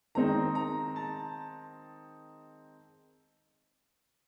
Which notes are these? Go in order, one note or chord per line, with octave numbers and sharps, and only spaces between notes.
D#3 G#3 C4 D#4 A#5
A#5
A5